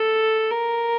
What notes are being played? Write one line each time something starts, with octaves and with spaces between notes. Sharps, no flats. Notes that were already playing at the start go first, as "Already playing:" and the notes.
Already playing: A4
A#4